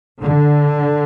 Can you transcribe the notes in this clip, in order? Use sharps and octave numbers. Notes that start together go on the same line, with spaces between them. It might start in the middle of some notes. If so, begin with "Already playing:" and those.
D3